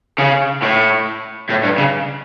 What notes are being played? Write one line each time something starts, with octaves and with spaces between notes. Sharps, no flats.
C#3
A2
A2
G2
C#3